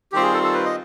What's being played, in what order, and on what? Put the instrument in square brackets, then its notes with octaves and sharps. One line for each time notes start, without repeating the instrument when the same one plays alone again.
[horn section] D#3 G3 C4 F4 [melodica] G4
[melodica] G#4
A4
A4
B4
D#5